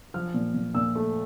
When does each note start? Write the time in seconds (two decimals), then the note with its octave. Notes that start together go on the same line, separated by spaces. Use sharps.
0.14 F3 F6
0.34 A#2
0.54 A#2
0.74 A#2 E6
0.95 A3